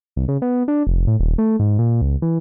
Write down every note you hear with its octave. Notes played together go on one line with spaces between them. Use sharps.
C2
C#3
B3
D4
F1
A2
D#1
A3
G#2
A#2
C#2
E3